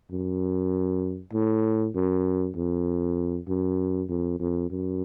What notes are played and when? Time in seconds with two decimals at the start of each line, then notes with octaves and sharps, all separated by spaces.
0.12 F#2
1.33 A2
1.95 F#2
2.56 F2
3.48 F#2
4.09 F2
4.39 F2
4.70 F#2